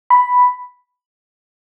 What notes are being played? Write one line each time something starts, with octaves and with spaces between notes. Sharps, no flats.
B5